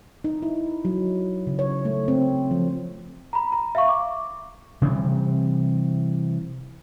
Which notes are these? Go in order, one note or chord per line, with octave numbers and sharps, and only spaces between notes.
D#4
E4
F#3
C#3
C#5
A3
C4
F3
A#5 B5
A#5
E5 F5 C#6
D6
C3 E3 G3 C4